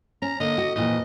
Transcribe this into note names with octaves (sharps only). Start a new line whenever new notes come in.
C#4 A#5
D3 A#3 D#5
F#4
F2 A#2 E3 D#5